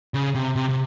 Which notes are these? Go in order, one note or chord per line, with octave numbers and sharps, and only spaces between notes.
C#3
C3
C3
C3